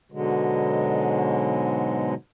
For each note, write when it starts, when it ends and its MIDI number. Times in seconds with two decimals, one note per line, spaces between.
0.12 2.14 44
0.12 2.14 47
0.12 2.14 50
0.12 2.14 54
0.12 2.14 56